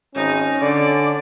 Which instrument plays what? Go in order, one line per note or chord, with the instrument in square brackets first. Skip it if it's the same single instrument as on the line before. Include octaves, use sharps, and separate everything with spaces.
[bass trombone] G#1 [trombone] C#4 [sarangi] D#4
[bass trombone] D3 [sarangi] D5